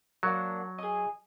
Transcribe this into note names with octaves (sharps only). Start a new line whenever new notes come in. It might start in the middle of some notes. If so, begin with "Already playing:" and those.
F#3 A#3 D4 F#5
G#4 D#5